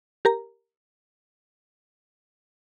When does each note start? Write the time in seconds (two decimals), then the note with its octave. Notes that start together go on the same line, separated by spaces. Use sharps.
0.25 G4 A#4 A#5